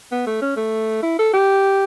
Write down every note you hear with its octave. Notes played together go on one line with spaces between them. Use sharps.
B3
A3
C#4
A3
E4
A4
G4